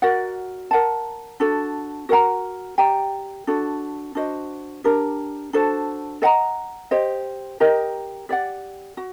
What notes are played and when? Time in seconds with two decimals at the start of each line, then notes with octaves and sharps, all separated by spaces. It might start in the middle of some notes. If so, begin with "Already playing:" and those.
0.02 F#4 A#4 D5 F#5
0.71 A#4 F#5 A5
1.40 D4 F#4 A4
2.09 F#4 A#4 F#5 A#5
2.78 G4 D5 G5 A#5
3.47 D4 F#4 A4
4.15 D4 F#4 C5 D#5
4.84 D4 G4 A#4
5.53 D4 F#4 A4 C5
6.22 A4 D#5 F#5 A#5
6.91 G4 C5 D#5
7.60 G4 A#4 D#5
8.29 G4 D5 F#5
8.97 F#4